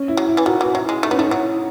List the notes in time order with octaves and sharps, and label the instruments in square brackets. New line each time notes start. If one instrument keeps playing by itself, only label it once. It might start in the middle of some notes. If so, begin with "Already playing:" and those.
Already playing: [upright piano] C#4
E4
[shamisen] F#3
[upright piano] E4
[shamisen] E3
[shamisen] D#3 [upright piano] F#4
[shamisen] E3 [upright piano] F#4
[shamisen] F#3 [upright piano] E4
[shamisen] G#3
[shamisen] A3 [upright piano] D#4
[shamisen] B3 [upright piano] C#4
[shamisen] A3 [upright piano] D#4
[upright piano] E4
[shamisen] F#3 [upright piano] D#4